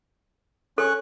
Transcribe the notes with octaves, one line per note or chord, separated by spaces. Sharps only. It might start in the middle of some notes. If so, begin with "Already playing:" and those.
C#4 A4 C#6 F#6